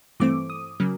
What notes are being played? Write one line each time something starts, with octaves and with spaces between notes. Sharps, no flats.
G2 E3 A3 C4 D6
D#6
C#3 F#3 A#3